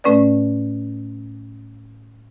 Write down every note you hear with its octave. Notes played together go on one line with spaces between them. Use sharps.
A2 A3 C#4 B4 D5